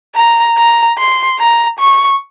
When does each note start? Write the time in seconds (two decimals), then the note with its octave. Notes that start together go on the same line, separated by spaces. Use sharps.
0.16 A#5
0.57 A#5
0.98 C6
1.39 A#5
1.79 C#6